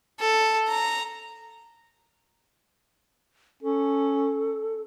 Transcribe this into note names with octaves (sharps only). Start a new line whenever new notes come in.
A4
A#5
C#4 A4